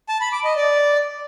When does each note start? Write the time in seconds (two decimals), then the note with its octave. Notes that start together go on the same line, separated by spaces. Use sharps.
0.09 A5
0.21 B5
0.33 D6
0.44 D#5
0.56 D5